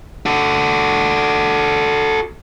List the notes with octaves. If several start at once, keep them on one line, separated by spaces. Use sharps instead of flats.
F#4 A4